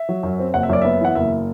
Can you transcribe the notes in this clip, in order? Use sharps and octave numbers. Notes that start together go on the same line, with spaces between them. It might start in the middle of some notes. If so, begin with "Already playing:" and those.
Already playing: E5
F#3
F#2
C4
F#1 F#5
E5
F#2 D5
B3 E5
E3 F#5
F#1 E5